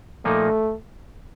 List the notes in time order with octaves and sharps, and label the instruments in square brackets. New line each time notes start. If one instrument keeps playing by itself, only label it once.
[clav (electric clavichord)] A#2 F3 A#3 D#4 [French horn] A3